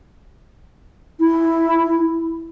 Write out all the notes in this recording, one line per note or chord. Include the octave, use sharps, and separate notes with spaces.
E4